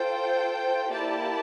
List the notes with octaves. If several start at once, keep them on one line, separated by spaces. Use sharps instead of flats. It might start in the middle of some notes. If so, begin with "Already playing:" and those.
Already playing: F4 A4 C5 G5
A#3 E4 G4 D5 A5